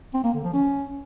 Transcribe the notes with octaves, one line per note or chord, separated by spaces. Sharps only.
C4
A#3
D3
F3
C#4